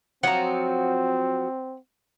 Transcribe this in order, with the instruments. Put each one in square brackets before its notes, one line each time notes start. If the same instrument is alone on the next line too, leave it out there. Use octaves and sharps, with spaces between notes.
[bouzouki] F3 F#3 F#4 [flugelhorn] C4 [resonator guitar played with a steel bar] F#5 A#5